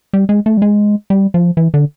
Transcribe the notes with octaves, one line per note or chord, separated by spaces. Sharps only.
G3
G#3
A3
G3
G#3
G3
F3
E3
D3